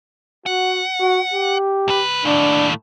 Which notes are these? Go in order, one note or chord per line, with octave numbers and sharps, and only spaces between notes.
F#4 F#5
F#4
G4
C2 B4
D#2 A2 D4